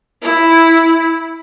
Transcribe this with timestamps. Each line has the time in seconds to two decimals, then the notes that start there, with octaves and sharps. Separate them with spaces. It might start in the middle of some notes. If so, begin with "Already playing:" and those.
0.22 E4